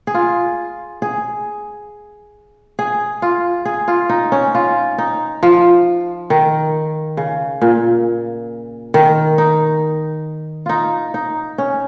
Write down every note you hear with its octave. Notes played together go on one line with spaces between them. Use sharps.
G#4
F4
G#4
G#4
F4
G#4
F4
D#4
C#4
F4
D#4
F3
D#3
C#3
A#2
D#3
D#4
D#4 F4
D#4
C#4